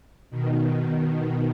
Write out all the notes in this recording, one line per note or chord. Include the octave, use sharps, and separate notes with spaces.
B2 D#3